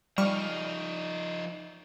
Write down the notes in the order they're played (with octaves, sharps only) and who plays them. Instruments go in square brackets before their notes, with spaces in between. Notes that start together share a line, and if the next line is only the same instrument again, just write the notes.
[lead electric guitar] F3 D#4 [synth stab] G3 C#6 F6